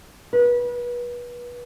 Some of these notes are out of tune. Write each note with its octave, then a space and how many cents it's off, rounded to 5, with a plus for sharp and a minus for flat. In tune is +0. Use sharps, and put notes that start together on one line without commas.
B4 -30